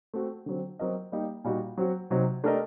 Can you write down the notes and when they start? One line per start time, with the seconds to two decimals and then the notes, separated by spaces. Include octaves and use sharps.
0.14 A3 C4 F#4
0.46 D3 F#3 C4
0.79 F#3 C4 F#4 A#4 D#5
1.12 G3 A#3 D#4 G4
1.44 A#2 G3 A#3 D#4 F#4
1.78 F#3 C4 F#4
2.10 C3 F#3 C4 D#4
2.44 A3 D4 G4 A#4 D#5